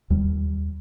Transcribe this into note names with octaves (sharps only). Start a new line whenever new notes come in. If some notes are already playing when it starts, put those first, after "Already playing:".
D#2 G3